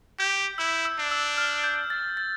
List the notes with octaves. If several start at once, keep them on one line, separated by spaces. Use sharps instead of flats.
G4 G6
E4 E6
E6
D4
E6
F6
G6
A6
A6